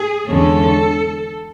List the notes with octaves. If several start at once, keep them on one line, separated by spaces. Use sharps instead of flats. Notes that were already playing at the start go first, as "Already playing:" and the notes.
Already playing: G#4
E2 D3 G#3 C#4 A4